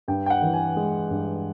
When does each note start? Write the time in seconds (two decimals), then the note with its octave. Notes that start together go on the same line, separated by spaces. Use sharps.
0.08 G2 G5
0.26 G5
0.30 F#5
0.42 E3
0.54 G#5
0.76 G#3
1.10 G2